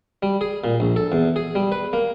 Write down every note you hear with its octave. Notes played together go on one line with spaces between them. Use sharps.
G3
G#4
A#2
A#1
A4
E2
G#4
G3
B4
A#3